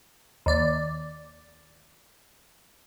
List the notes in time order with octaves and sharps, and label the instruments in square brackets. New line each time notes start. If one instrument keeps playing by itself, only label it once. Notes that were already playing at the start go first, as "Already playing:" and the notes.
[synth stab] D#2 D5